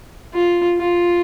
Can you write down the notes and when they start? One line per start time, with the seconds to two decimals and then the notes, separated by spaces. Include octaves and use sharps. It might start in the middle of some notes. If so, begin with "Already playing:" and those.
0.34 F4
0.78 F4